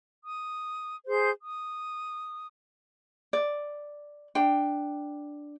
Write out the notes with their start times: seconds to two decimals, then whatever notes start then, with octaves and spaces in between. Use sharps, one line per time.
0.24 D#6
1.06 G#4 C5 G6
1.41 D#6
3.33 D5
4.35 D4 G5